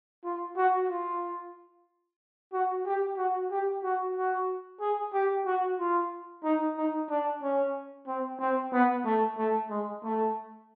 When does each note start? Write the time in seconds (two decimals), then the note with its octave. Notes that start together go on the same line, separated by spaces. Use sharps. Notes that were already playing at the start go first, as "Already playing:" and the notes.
0.25 F4
0.57 F#4
0.89 F4
2.53 F#4
2.85 G4
3.17 F#4
3.51 G4
3.84 F#4
4.15 F#4
4.81 G#4
5.13 G4
5.46 F#4
5.79 F4
6.44 D#4
6.77 D#4
7.10 D4
7.43 C#4
8.07 C4
8.39 C4
8.73 B3
9.05 A3
9.38 A3
9.70 G#3
10.04 A3